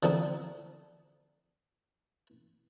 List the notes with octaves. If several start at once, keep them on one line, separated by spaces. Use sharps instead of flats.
D3 F3 C4 D#4